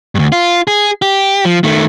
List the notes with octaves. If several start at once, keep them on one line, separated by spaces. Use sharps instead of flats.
D2 G2
F4
G#4
G4
F3
D#3 A3